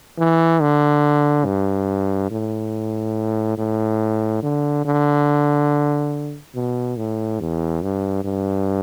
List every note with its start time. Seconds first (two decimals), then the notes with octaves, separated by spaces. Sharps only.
0.18 E3
0.61 D3
1.45 G2
2.31 A2
3.57 A2
4.42 D3
4.85 D3
6.55 B2
6.97 A2
7.40 E2
7.82 G2
8.24 G2